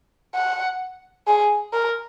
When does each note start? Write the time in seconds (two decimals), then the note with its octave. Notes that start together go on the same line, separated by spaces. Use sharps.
0.35 F#5
1.27 G#4
1.73 A#4